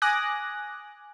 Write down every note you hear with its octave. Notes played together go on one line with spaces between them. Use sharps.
G#5 D6 D#6 F#6 A#6